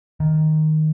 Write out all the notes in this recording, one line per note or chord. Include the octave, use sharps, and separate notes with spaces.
D#3